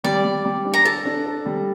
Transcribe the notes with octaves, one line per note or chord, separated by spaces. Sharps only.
G3 D5
G3
G3
D4
A#5
A4 A5
D4
A4
G3